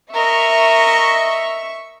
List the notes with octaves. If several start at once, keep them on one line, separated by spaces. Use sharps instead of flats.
A#4 D#5 E5 C#6